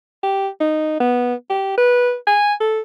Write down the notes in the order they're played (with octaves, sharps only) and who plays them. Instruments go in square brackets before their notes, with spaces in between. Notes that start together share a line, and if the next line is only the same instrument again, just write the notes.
[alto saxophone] G4
D#4
B3
G4
B4
G#5
A4